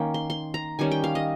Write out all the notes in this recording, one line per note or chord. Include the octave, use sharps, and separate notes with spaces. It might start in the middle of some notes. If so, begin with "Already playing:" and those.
Already playing: D#3 A#3 C#4 G5
C6
C6
A#5
D#3 G3 C#4 G#5
G5
F5
D#5